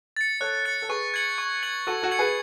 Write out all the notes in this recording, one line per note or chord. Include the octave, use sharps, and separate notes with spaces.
A6 C#7
A4 C#5 F#6
A6 C#7
A4
G#4 B4 C#6
G#6 C#7 F#7
C#6
G#6 C#7 F#7
F#4 A4 C#6
F#4 A4
G#6 C#7 F#7
G#4 B4